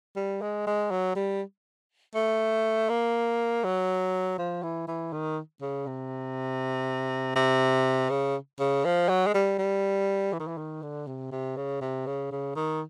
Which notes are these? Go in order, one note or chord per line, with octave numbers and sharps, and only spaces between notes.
G3
G#3
G#3
F#3
G3
A3
A#3
F#3
F3
E3
E3
D#3
C#3
C3
C3
C#3
C#3
F3
F#3
G#3
G3
G3
E3
D#3
E3
D#3
D3
C3
C3
C#3
C3
C#3
C#3
D#3